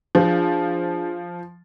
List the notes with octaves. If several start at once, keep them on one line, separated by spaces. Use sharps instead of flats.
F3 D4 F4 G#4